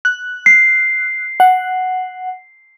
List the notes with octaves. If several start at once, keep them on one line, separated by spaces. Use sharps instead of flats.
F#6
C7
F#5